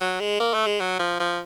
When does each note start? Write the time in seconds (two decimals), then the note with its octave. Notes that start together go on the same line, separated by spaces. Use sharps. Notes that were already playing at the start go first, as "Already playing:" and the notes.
0.01 F#3
0.20 G#3
0.40 A#3
0.54 A3
0.67 G#3
0.80 F#3
0.99 F3
1.20 F3